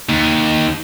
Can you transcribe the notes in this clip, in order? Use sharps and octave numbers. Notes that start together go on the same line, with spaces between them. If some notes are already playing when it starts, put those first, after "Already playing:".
D#2